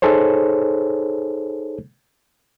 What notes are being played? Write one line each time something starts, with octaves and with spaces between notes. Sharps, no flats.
D#4 G#4 A4 C5 C#5